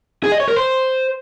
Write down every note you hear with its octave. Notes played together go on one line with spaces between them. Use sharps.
G#4
D#5
C#5
A#4
C5